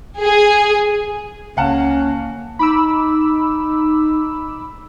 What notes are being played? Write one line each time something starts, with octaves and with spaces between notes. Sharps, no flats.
G#4
C#2 A#3 C#4 F5 F#5 A5
D#4 B5 D6 E6